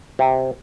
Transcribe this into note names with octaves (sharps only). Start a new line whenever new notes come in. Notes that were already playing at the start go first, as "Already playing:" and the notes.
C3